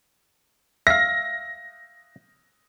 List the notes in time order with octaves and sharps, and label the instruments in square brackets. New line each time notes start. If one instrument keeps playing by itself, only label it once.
[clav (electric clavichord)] E5 F5 [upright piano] A#6